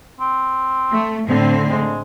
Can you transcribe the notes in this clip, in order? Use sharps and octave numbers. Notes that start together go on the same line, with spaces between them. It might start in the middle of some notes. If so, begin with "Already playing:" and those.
C4
A3
A2 D3 C4
G#3